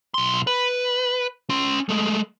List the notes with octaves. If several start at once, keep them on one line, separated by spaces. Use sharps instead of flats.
B1 C6
B4
C#4 C6
G#3 A3